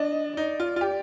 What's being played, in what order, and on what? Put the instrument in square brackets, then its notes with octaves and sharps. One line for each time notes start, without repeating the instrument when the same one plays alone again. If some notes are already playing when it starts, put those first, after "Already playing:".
Already playing: [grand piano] D4 [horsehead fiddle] D#5
[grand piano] D#4 [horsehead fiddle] D5
[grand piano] F4
F4
G4